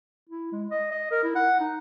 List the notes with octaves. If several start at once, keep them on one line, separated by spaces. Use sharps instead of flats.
E4
G#3
D#5
D#5
A#4
E4
F#5
D#4